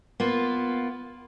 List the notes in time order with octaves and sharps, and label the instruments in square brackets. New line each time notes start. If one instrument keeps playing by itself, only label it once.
[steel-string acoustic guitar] A#3 B3 F4